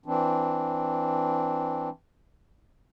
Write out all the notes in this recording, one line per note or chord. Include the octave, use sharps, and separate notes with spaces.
E3 C4 D4